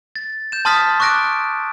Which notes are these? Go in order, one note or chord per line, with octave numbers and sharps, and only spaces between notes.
A6
G6 E7
A5 C6 D#6 F6 A6 B6
C#6 D6 F#6 A#6 D7